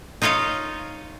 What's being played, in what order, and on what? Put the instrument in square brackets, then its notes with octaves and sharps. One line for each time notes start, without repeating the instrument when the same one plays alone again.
[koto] D#4 F4 C#5 D#5 F5